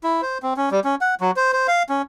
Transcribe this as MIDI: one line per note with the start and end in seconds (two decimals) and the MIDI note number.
0.04 0.21 64
0.22 0.38 72
0.43 0.54 60
0.57 0.69 61
0.71 0.80 55
0.84 0.95 61
1.01 1.15 78
1.21 1.31 54
1.36 1.53 72
1.53 1.67 72
1.68 1.83 77
1.89 2.02 61